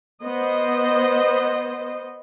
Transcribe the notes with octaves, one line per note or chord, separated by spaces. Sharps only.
B3 C5 D#5